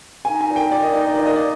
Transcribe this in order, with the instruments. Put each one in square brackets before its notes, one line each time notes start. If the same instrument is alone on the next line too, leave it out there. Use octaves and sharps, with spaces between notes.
[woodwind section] D#4 [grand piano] G#5
[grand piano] G#5
[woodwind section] A#2
[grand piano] G5
[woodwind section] A#2 [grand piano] D5
[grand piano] D#5
[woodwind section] D#4 [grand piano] D5
[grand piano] D#5
[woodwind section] A#2 [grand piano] D5
[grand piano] D#5
D5